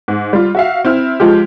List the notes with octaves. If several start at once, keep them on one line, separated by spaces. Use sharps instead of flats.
G#2
G3 F4
F#4 E5 F5
C4 E4 F6
F3 G#3 F4 G4